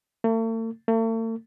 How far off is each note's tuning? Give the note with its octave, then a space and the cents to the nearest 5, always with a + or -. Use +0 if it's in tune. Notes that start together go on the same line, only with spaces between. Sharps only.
A3 +40
A3 +40